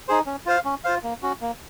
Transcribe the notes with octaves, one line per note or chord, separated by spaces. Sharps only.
D#4 G#4 C5
C#4
F4 C5 F5
C#4
F4 C5 F5
A#3
C#4 F#4
A#3